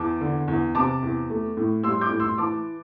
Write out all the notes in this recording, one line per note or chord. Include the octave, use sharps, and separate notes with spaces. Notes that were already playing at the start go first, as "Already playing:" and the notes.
Already playing: E2 A5 D6
D3
E2
C3 A5 D6
E2
A3
A2
G3 C6 E6
D6 G6
A2
C6 E6
E3 A5 D6